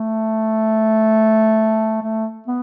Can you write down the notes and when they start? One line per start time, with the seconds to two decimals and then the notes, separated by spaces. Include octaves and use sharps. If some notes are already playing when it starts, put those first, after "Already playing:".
Already playing: A3
2.02 A3
2.48 B3